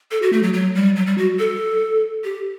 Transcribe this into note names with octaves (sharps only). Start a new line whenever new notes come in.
A4
F#4
A3
F#3
F#3
G3
F#3
G3
F#4
A4
G4